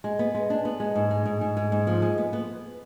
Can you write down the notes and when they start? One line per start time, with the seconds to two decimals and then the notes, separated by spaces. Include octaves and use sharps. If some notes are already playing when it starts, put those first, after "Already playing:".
0.04 G#3
0.19 B3
0.34 G#3
0.50 D4
0.65 B3
0.80 G#3
0.95 G#2
1.11 G#3
1.26 G#2
1.41 G#2
1.57 G#3
1.72 G#2
1.87 F3
2.02 G#3
2.18 B3
2.33 B3